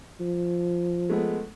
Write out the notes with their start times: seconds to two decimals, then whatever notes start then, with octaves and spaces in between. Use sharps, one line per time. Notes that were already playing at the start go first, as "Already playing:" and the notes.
0.20 F3
1.09 G#3 A3 B3